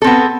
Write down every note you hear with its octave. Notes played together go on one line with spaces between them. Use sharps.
B3 C4 A4